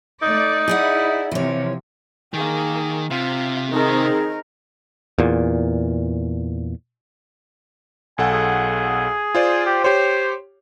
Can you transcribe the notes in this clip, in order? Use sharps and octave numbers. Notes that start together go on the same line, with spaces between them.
A3 D#4 D5
E4 G#4 D5 F#5
C3 E3 F3 C#5
D#3 A#3 G#4
C3 F4
D#3 C4 D#4 G#4 A#4
E2 A#2
B1 A4 F#5 G#5
G#4
F4 C5 D5
G4
G4 C5 C#5